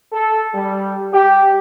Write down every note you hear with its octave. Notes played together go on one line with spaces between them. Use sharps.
A4
G3
G4